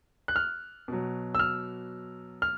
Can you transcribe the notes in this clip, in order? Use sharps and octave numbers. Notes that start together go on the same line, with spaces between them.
F#6
F6
B2 F#3
E6
F6
F6